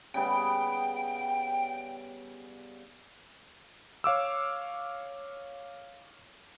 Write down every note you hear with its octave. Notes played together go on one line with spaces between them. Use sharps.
C#3 G3 B3 G5
C#5 F5 D6 E6